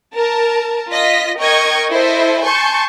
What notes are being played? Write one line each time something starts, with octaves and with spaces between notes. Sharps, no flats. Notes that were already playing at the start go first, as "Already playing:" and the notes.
A#4 A5
F4 D#5 A#6 B6
A#4 D#5 G5 C#6 G#6
E4 A4 C5 D#5 E5
G#5 A5 C6 C#6 G6